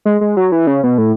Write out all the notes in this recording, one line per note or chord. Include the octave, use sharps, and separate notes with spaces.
G#3
G#3
F#3
E3
C#3
B2
A2